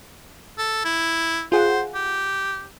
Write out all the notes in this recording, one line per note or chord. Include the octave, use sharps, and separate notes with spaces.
A4
E4
F4 G#4 C5 F#5
G4